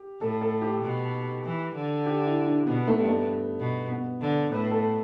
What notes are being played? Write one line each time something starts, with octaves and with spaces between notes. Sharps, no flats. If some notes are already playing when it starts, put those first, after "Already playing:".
Already playing: G4
A2 A4
A4
G4
B2
E3
D3
G4
E4
D4
B2 B3
A3
G2
A3
B2
B3
D3
A2 B4
A4